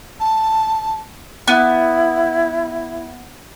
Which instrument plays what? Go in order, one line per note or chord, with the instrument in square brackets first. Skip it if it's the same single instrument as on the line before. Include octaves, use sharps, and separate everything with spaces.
[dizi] A5
[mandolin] B3 [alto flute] E4